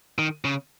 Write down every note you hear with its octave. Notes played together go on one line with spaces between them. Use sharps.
D#3
C#3